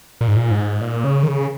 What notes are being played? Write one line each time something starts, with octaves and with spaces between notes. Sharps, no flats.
A#2
G#2
A#2
G#2
A#2
C#3
D#3
C#3